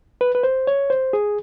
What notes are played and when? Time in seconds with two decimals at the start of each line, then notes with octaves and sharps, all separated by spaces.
0.21 B4
0.35 B4
0.43 C5
0.67 C#5
0.90 C5
1.13 G#4